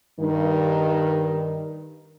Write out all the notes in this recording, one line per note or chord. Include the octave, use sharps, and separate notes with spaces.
G2 D#3